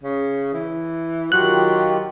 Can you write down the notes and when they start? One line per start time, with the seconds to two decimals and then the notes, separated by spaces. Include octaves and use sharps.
0.03 C#3
0.53 E3
1.32 D#3 F#3 F4 G4 F#6